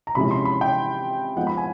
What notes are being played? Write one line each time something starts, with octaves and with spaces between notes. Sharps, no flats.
A#5
C3 F3 G#3 C#4 E4 B5
C6
B5
G5
F3 G#3 B3 D#4 F#5
B5
G#5